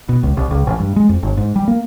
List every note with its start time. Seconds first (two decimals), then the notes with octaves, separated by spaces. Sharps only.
0.09 B2
0.23 C#2
0.37 C2
0.51 C#2
0.67 A1
0.80 G2
0.96 G#3
1.09 F2
1.23 G1
1.37 G#2
1.56 G3
1.68 A#3